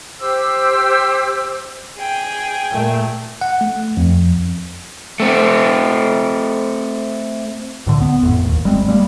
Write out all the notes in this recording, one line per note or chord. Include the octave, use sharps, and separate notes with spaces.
G4 C5 E6
G#4 G5
A#2 A3
F#5
A3
F2
A3 C4
C#2 A2 D3
B3
G#1 F2 A2
D1 D#2
G1 G3 G#3 C4
G3 G#3 A#3